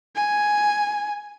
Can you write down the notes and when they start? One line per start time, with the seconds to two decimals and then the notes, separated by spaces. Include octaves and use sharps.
0.16 G#5